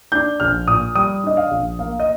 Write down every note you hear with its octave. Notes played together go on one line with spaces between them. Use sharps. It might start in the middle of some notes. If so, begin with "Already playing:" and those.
D4 G6
A#1 F6
A#2 D#6
G3 D#6
D4 D#5
F5
A#1
A#3 F5
D#5